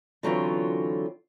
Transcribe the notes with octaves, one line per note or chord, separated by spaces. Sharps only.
D3 E3 F#3 C4 C#4 F4